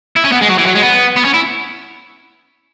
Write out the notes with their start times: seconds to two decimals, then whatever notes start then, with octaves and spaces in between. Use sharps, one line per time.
0.16 E4
0.25 C#4
0.32 B3
0.42 G#3
0.49 F#3
0.58 E3
0.66 F#3
0.75 G#3
0.83 B3
1.17 B3
1.25 C#4
1.34 E4